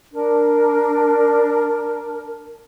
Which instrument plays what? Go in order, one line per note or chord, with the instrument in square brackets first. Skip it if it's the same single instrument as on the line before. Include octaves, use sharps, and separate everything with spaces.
[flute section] D4 A#4